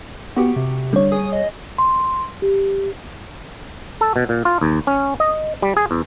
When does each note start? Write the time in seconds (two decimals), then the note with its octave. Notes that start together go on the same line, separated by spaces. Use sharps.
0.36 B3 F#4 G4
0.56 C3
0.93 D3 G3 C#5
1.12 G#4 D#6
1.32 D#5
1.78 C6
2.42 G4
4.01 A4
4.16 B2
4.29 A#2
4.45 F4
4.61 D#2
4.87 C#4
5.20 D#5
5.62 G3
5.77 G#4
5.91 E2